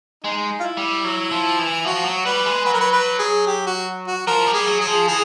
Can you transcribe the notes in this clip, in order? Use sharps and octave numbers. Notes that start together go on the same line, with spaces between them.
G#3 D#4
F4
E4
G3
F#3
F3
E3
F3 F#4
F#3
G3 B4
G#3
F#3 B4
A#4
B4
B4
G#4
G4
F#4
F#4
F3 A#4
G3
G#4
F#3
G#4
F3
E3 G#4